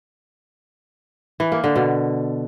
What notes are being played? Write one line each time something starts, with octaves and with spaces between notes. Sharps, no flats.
E3
A#3
D3
B2